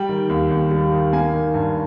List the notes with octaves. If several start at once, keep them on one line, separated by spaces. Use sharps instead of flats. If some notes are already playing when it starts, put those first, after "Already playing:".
Already playing: G3 G5
D#3
D#2
D#2
G3
D#3
A#3 G#5
D#3
G2